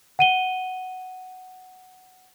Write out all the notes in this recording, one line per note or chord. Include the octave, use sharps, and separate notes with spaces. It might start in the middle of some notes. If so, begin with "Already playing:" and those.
F#5 D#7 G7